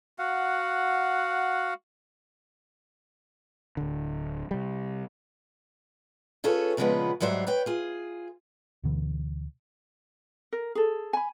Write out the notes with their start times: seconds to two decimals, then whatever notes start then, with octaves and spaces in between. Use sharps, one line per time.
0.19 F#4 F5 F#5
3.77 D1 D3
4.51 C3 G3
6.44 C#4 F4 G#4 A4 B4 C#5
6.77 A#2 C#3 F3 G#3 B3 B4
7.20 G#2 F#3 G3 C5 E5
7.47 B4 C#5 G5
7.66 F4 G#4
8.83 D2 B2 D3 E3
10.53 A#4
10.75 G#4 A4
11.13 G#5 B5